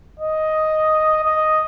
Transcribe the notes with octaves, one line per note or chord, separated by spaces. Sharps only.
D#5
D#5